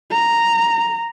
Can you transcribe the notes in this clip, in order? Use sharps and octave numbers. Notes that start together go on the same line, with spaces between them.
A#5